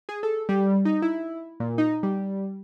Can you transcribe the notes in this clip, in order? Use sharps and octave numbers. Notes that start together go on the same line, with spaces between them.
G#4
A4
G3
D#4
E4
A#2
D#4
G3